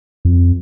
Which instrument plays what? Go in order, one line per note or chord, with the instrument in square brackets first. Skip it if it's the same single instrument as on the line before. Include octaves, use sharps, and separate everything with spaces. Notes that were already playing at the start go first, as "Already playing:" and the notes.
[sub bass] F2